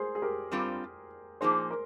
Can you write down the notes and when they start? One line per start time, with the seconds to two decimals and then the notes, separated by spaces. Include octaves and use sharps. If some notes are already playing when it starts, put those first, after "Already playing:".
Already playing: G#4 A#4 C5
0.15 G#4
0.22 G4 A#4
0.52 G2 G3 C4 F4
1.41 A#2 F3 A#3 D#4 G#4 C5
1.71 A#4